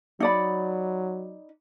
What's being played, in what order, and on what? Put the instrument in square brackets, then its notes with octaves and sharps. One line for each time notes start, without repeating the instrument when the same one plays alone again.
[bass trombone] F#3 [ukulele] D#4 D5 B5